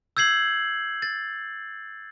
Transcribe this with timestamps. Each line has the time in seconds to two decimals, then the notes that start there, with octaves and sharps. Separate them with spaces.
0.17 E6 G6 G#6 C7 F#7
1.02 A6